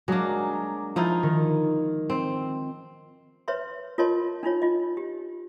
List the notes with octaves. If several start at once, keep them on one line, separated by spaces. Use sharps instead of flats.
F#3 G#3 A#3 D4
F3 D#4 E4
D#3
C4
B4 C#5 E5 C6
F4 A#4 C#5 D#5 A5 C6
D4 D#4 F4 C#5
F4 D#5
G4